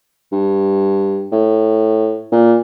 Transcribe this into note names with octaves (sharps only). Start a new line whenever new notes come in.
G2
A2
A#2